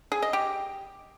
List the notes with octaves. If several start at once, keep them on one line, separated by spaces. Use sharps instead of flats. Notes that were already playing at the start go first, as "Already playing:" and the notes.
G#4
D#5
G4